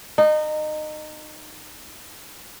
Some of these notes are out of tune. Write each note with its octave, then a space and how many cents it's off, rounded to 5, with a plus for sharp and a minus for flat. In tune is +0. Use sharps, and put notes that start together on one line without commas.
D#4 -25